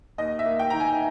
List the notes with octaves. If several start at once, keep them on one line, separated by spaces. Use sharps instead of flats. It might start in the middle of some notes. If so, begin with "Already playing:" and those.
D#2 D#5
E5
A#3
G5
D#3 A#5
G#5